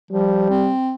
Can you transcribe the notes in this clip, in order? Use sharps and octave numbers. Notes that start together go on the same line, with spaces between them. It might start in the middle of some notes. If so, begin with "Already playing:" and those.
F3 G3
C4